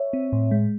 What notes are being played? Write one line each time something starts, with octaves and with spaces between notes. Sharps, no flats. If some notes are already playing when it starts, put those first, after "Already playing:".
Already playing: C#5 E5
C4
A2
G#3